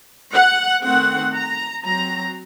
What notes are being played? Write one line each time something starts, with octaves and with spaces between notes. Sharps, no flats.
F#5
D#3 A3 C4 F#5
A#5
F#3 C4 A#5